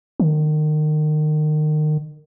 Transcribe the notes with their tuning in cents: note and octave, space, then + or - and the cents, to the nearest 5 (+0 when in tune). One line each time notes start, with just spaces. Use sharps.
D#3 -30